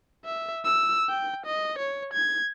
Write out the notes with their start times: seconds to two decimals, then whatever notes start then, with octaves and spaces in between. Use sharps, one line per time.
0.25 E5
0.65 E6
1.09 G5
1.46 D#5
1.78 C#5
2.13 G#6